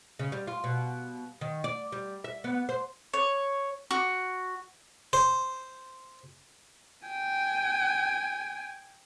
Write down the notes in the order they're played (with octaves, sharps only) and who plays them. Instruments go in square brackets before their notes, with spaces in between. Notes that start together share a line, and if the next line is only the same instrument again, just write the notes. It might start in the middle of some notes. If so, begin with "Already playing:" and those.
[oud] C#3
G3
F4
B2
D#3
D5
G3
E5
B3
C5
[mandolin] C#5
F#4
[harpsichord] C5
[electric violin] G5 G#5